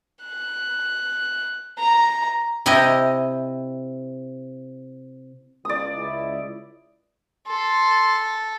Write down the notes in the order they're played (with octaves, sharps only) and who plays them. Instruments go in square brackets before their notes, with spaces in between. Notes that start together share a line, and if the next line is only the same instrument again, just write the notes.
[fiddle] F#6
A#5
[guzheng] C3 E4 G4 D#5
[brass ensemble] C#2 [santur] D5 D#6
[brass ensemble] C#2 E4
[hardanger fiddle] A4 [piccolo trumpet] C6